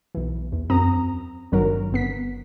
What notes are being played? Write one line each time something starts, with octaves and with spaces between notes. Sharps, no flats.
B1 E3
E2
F#2 C4 A#5 D#6
G#1 G2 D#3 F#3 A#4
G1 B3 B6